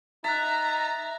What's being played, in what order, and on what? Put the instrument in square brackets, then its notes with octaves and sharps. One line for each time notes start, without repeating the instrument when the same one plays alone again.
[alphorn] D#4 [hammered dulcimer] E5 [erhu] A#5 [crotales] F#6 A6